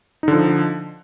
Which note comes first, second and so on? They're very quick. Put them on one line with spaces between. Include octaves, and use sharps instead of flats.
D#4 D3 F3